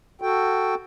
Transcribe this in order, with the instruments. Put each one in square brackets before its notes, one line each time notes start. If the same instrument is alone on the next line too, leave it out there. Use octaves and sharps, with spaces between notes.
[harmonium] F#4 A4 G5